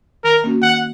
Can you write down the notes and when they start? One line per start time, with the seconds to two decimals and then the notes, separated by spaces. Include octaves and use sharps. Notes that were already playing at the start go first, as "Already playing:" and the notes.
0.24 D#3 A#4
0.44 A#3 C#4 F#4
0.62 D#3 F#5